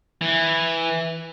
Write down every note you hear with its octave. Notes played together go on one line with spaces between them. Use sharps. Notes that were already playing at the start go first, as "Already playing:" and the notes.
E3